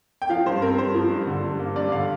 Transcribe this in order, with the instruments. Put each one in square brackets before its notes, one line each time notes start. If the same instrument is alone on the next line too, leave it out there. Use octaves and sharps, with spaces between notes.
[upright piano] G5
F3 F5
G2 C5
C4 A#4
G2 C5
F3
G2
D3
G2
A#3
G2 D5
D3 F5